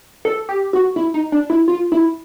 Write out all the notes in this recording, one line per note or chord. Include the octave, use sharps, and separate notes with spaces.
A4
G4
F#4
E4
D#4
D4
E4
F4
E4